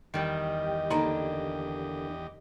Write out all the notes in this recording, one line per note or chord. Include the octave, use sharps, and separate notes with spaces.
E2 D#3 G3 G4 D#5
D3 A#3 D4 D#4 A#5 B5